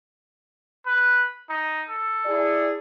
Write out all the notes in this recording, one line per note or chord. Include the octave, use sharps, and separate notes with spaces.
B4
D#4
A4
E4 G#4 D5